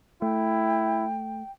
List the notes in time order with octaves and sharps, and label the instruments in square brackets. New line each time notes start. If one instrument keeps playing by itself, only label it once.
[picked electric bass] A3 [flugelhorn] E4 [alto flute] G5